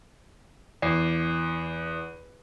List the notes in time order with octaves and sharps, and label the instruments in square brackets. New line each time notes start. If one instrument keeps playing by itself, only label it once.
[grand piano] E2 [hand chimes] D5 C7